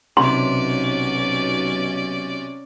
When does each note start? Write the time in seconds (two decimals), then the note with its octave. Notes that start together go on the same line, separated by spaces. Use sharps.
0.17 B1 C3 C#4 D5 C6